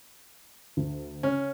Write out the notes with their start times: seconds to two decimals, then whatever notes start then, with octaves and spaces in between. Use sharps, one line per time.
0.77 D2
1.23 C#3 C#4 C#5 F6